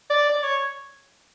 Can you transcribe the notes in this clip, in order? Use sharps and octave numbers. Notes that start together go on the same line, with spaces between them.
D5
D5
C#5